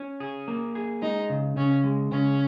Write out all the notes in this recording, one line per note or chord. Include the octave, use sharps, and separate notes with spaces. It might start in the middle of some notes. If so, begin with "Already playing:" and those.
Already playing: C#4
G#4
A#3
G#4
G#3 D#4
C#3
C#3 C#4
G#3
C#3 C#4